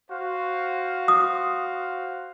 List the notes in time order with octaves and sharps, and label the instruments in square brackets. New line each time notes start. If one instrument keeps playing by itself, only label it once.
[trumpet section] F#4 C5 F5
[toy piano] D#6